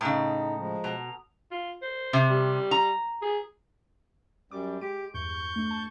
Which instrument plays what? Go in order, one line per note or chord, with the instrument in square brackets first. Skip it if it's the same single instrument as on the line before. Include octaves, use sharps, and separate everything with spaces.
[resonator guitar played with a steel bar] A2 C#3 [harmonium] D#4 [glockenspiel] A5 A#5 D#6
[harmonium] F3 G#3
[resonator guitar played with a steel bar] B2 [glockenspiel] F7
[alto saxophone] F4
C5
[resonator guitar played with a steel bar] C3
[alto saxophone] G3
[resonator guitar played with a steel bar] A#5
[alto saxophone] G#4
[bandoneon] F#2 G3 [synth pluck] D6
[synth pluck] G#3 D7 [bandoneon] G4
[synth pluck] E2 G2 [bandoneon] C#6 G6
[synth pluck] A3 D4
A5